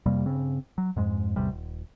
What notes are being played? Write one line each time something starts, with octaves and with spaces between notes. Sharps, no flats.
F2 C3 G3 A#3
G2 C#3 C4
F#3
F2 G#2 G#3
A1 E2 C3 G3
D#1